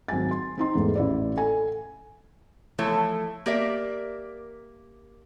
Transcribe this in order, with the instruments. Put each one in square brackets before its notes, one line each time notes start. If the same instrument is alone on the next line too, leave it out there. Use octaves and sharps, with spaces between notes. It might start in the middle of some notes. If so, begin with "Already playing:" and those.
[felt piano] G#1 F#3 G#5 A6
C6
C4 D#4 C6
E2 G#2 A3
A1 E4 D5
A4 G#5
[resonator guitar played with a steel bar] E3 F3 A3 E4 A4 C#5
A#3 G4 A#4 D5 E5